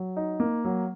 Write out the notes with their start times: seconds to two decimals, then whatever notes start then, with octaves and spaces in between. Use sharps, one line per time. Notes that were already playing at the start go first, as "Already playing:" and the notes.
Already playing: F#3
0.16 D#4
0.40 A#3
0.65 F#3